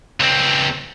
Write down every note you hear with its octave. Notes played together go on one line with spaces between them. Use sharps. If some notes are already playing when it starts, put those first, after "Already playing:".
C#2 C4